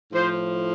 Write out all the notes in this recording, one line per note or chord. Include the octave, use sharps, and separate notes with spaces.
A2 F3 C5